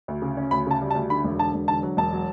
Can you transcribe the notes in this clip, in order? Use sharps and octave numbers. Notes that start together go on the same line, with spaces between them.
D2
C#3
C#4
D2 B5
C#3 A5
G3
A5
D2
D3 B5
E1
D3 A5
E1
D3 A5
F#3
E1 A5
F#3